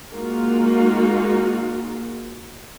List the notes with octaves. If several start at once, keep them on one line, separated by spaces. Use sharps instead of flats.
G#3 A#3 D#4 F4 F#4